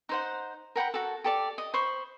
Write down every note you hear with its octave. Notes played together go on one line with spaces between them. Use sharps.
D#4 C5 F#5
A#4 F#5 G5 B5
F#4 A4
G4 A4 D5
D#5
C5 B5 C#6